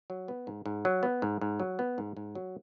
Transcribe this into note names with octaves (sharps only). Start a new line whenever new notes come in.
F#3
B3
G#2
G#2
F#3
B3
G#2
G#2
F#3
B3
G#2
G#2
F#3